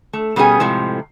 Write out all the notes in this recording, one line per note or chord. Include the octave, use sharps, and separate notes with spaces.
A3
B2 G3 B3 C#4 G#4 G#5
A2 C3 F3 G#3